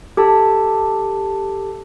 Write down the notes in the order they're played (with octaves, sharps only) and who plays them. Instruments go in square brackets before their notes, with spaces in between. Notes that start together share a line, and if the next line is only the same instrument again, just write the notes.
[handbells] G4 A4 A5